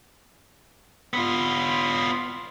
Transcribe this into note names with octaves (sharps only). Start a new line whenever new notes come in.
B3 F4